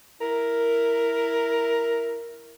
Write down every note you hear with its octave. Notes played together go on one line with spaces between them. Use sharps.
E4 A#4